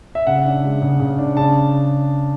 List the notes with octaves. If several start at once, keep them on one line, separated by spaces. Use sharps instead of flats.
E5
C#3 F#5
D4
G#3
C#3
C#3
D4
C#3 A5